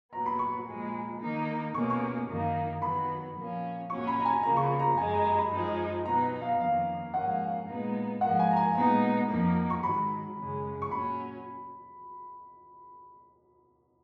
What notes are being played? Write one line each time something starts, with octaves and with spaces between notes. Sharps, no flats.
A#2 F#3 B3 A#5
B5
C#6
A#2 F3 G#3
D#3 A#3 D#4
B2 A#3 C#4 C#6
C#6
F#2 D#3 A#3 D#4
D#3 F#3 B3 B5
A#2 F3 A#3 C#4
A#2 F#3 C#4 C#6
B5
A#5
G#5
C#3 F3 A#3 A#5
C#6
B5
A#5
F#2 C#3 G#3 G#5
A#5
A#5
B5
F#2 F3 G#3 D#4
B2 F#3 B3 D#4 A#5
F5
F2 D#3 A#3 C#4 F5
G#2 F3 A#3 C#4 F#5
A#2 G#3 B3 D#4
G#2 F3 A#3 F#5
G#5
A#5
G#5
A#2 G#3 B3 D#4 A#5
F2 F3 A#3 D#4
C#6
G#2 D#3 F#3 B5
F#2 C#3 G#3 C#4
C#6
A#2 F#3 C#4 B5